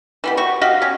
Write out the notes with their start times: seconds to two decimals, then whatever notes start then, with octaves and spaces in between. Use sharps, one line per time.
0.24 E3 B3 G4
0.37 F#4 G4 C#6
0.61 F#4 G4 D#5 F5
0.82 C#4 G4